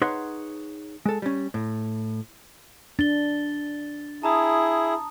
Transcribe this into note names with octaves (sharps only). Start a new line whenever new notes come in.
D#4 G#4 B4 C#5 F#5 C6
G#3 A4
G3 C#4
A2
D4 A6 G7
E4 G#4 A5 A#5 D#6